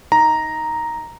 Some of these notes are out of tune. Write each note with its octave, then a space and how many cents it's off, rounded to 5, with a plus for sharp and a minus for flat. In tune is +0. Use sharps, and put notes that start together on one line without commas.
D#4 +15 A#5 +0